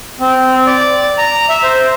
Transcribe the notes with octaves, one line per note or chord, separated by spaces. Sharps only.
C4
D5
A#5
E5
C5